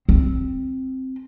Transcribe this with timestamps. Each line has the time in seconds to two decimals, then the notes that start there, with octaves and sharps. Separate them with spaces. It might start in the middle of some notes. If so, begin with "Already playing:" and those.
0.09 C4